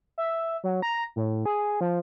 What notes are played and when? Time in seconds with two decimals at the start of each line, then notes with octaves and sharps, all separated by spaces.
0.18 E5
0.64 F#3
0.82 A#5
1.16 A2
1.45 G#4
1.81 F3